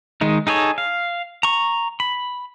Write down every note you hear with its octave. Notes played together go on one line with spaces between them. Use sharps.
D#3 G#3 D#4
D#4 G#4 A4 C#5
F5
A#5 C#6
B5